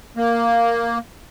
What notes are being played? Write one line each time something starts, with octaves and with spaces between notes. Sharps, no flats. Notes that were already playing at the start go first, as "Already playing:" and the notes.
A#3